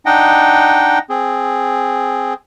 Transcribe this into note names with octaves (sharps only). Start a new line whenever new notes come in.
D4 D#4 D#5 F#5 G5
C4 G#4